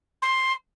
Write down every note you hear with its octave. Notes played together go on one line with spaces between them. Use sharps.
C6